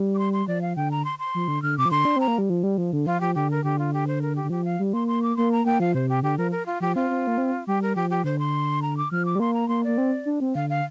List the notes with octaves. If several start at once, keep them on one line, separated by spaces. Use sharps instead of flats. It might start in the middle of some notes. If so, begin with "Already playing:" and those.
Already playing: G3
D6
C6
C6
F3 D5
F5
D3 G5
A#5
C6
C6
F3
D3
D3 F6
C3 D6
F3
D3 C6
D4
C4 A#5
A#3
G3
F3
G3
F3
D3
F3 F4
F3 G4
D3 G4
A#4
D3 G4
F4
G4
C5
A#4
G4
D3
F3 G4
F5
G3
A#3 C6
C6
D6
A#3 C6
A#5
A#3 G5
F3 F5
C3 C5
G4
D3 G4
F3 A#4
A#4
F4
F3 G4
C4 F4
C4
A#3
C4
G3 G4
A#4
F3 G4
G4
D3 C5
C6
A#5
D6
F3 F6
D6
G3
A#3 C6
A#5
A#3 C6
A#3 D5
C4
D4
C4
D3 F5
F5